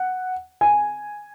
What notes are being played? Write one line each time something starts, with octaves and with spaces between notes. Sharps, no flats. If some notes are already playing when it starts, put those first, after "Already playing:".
Already playing: F#5
G#5